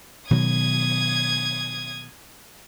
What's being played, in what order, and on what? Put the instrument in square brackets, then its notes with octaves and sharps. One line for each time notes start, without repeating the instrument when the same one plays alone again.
[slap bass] B2 D#3 F#3 [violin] D#6 G#6